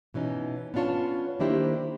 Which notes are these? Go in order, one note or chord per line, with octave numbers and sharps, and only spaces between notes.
B2 E3 C#4 D#4
B3 C#4 D4 F4 C#5 A5
D#3 A#3 D4 E4 G4 C5